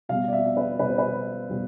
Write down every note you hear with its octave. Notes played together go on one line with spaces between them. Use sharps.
B2 G3 B3 F5
D5
E5
B4
B2 G3 B3 B4
C5
B4
B2 G3 B3